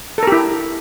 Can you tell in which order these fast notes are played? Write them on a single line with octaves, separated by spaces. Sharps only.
A4 A#4 G4 E4